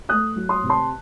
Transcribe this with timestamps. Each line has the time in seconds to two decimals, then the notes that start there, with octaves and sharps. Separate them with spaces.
0.09 A3 D#6 F#6
0.36 F#3
0.49 C6 D#6
0.63 C3
0.69 A5 C6